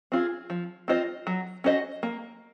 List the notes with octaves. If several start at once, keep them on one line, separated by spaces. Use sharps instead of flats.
C4 F4 G#4
F3
C4 F4 C5 D#5
F#3
C#4 F#4 C5 D#5
A#3